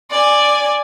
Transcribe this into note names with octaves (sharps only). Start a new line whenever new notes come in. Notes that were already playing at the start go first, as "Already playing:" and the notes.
D5 G#5